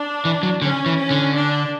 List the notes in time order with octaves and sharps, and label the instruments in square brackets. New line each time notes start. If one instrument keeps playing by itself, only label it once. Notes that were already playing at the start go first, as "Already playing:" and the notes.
Already playing: [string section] D4
[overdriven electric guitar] E3
F#3
[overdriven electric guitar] D3 [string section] C#4
[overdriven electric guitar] E3
[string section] C#4
[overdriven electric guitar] D3
[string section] D4